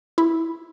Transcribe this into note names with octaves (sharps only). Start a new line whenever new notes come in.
E4